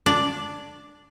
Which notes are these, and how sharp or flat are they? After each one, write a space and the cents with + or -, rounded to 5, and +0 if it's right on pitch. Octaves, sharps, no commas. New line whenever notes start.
D4 +0 D5 +0